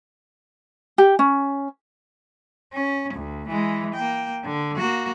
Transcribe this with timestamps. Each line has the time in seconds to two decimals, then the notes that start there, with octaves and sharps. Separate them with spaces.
0.98 G4
1.19 C#4
2.74 C#4
3.14 D2
3.49 E3 G#3
3.95 A#3 G5
4.45 D3
4.77 A#3 F#4